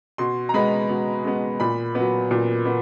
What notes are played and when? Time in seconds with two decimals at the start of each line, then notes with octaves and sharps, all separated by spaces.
0.18 B2 C6
0.49 A#5
0.54 G#3 B3 B5
0.89 B2
1.24 G#3 B3
1.60 A#2 B5
1.95 F#3 B3
2.31 A#2
2.66 B3